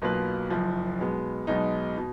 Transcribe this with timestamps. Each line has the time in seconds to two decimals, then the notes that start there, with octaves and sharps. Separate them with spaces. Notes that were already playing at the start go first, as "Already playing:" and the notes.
0.02 B1 B2 A#3 F4 B4
0.50 F#1 F#2 F3
0.99 B1 B2 G#3 B3
1.47 B1 B2 G#3 B3 D#4
1.98 B2